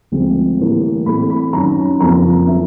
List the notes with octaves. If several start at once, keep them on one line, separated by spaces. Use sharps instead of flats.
D2 D3 F3 G#3 C4
A2 E3 G3 A#3
A2 E3 A3 C4 B5
B5
F#2 D#3 F#3 A#5
F2 C#3 F3 A#3 A#5
D3 F#3 A#3 E5